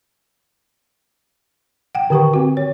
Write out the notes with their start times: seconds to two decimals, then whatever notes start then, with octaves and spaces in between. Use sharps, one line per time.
1.95 F#5 G5
2.10 D3 D#3 G4 B4 G5 C#6
2.34 C4 F#4
2.57 C#5